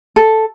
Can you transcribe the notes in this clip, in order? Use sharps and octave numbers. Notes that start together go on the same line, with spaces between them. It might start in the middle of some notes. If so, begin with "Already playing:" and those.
A4